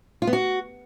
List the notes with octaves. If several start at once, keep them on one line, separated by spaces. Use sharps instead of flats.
F4
B3
F#4